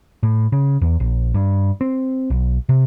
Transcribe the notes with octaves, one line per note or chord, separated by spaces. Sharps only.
A2
C#3
E2
A#1
G2
C4
B1
C3